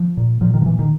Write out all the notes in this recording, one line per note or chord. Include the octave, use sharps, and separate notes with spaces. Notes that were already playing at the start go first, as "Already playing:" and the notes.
Already playing: F3
A#2
A#2 F3
D#3
F3
A#2 E3
D#3